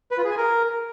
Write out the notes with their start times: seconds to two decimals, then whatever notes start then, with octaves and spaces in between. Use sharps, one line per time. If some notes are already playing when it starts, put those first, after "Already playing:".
0.11 B4
0.18 F4
0.24 G#4
0.31 G#5
0.37 A#4